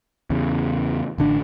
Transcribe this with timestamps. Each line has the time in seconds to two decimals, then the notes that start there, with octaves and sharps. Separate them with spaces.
0.30 E2 C#3
1.18 A1 D3 D4